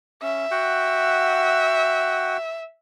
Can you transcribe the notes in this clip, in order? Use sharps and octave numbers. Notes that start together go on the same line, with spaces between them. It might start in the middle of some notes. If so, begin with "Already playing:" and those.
C#4 E5
F#4 F#5 G5